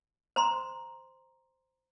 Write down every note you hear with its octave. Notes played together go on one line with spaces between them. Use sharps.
C5 A#5 C6